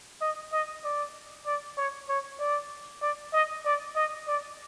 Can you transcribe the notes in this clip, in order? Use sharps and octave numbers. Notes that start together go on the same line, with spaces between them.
D#5
D#5
D5
D5
C#5
C#5
D5
D5
D#5
D5
D#5
D5